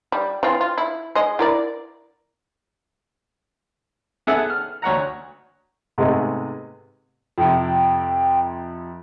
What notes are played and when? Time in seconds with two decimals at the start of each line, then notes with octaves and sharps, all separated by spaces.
0.12 G3
0.43 E3 C4 F4
0.61 F4
0.78 E4
1.15 G#3 D#5
1.39 E4 A#4 D5
4.27 B3 G#4 A4 E5 F#5
4.50 F6
4.82 D2 C#5 F#5 A#5
5.98 G#2 C3 G#3 A3 B3
7.38 F2 C3 G5